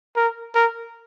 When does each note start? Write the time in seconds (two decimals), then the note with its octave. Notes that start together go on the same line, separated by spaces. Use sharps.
0.16 A#4
0.55 A#4